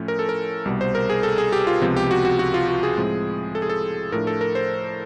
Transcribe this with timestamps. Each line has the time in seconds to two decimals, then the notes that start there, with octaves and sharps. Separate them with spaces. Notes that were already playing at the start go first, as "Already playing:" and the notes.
Already playing: A2 F3 A3 C#4
0.08 A#4
0.19 A4
0.29 A#4
0.65 C2 B2 G3
0.81 C5
0.95 A#4
1.10 G#4
1.23 A4
1.38 G#4
1.52 G4
1.67 F4
1.82 C#2 C3 F3 G#3 B3
1.96 G4
2.11 F#4
2.25 F#4
2.39 F#4
2.54 F4
2.68 F#4
2.83 G#4
2.97 A2 F3 G#3 C4
3.55 A4
3.62 G#4
3.69 A4
4.12 A2 F3 A3 D4 A#4
4.27 A4
4.41 A#4
4.55 C5